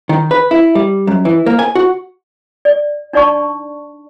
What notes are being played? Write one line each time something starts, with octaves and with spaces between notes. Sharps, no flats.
D#3
B4
E4
G3
F#2
E3
A#3
G#5
F#4
D5
D4 D#4 D5 A5 C#6